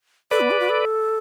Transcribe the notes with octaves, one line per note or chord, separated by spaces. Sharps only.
A4 B4 D5
B3
G#4
F#4
A4